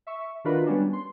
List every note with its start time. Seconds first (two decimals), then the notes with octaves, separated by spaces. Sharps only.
0.07 E5 C#6
0.44 D#3 D4 F4 F#4 A#4 B4
0.66 G3 B3 C#4 D4
0.93 C6